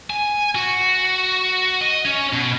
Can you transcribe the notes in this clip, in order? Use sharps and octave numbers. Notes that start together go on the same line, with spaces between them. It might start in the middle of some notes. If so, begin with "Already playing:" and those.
G#5
F#4
D#5
C#4
B2